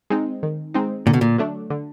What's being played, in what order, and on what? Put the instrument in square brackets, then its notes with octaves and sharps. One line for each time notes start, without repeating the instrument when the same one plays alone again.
[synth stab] G#3 C4 D#4
D#3
G#3 C4 D#4
[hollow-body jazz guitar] A#2 [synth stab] D3
[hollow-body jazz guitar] B2
A#2
[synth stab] F#3 A3 D4
D3